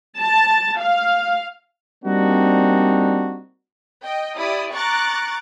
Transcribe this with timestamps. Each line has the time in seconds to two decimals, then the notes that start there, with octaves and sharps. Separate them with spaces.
0.19 A5
0.79 F5
2.05 G3 A#3 C4 D4 D#4 F#4
4.02 D#5 G5
4.37 E4 G4 D5 D#6
4.74 A#5 C#6 D6 F#6 A6